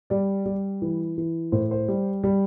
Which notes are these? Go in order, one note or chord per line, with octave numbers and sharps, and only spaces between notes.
G3 D5
G3
E3
E3
A2 C5
C5
G3
G3